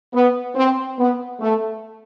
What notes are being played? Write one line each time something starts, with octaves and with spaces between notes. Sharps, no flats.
B3
C4
B3
A3